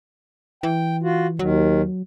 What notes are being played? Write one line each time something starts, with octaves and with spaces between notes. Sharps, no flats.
E3 G5
F4 F#4
D#2 D#3 F#3